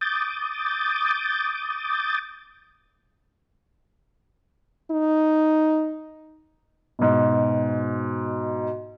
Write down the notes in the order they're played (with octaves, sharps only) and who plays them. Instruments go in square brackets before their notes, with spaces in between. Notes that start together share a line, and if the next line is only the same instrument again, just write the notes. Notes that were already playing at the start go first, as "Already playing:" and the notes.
[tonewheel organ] D6 D#6 G6 A6
[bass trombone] D#4
[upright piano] G#2 B2